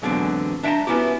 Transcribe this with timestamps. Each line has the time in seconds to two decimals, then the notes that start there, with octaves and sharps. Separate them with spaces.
0.02 E2 G#2 B2 D3 F#3 C4
0.63 D4 E5 G5 A5 A#5
0.87 B3 C#4 E4 F#4 G4